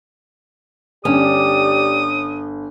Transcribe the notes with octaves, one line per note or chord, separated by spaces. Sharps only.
G1 C#4 G4 D5 D#6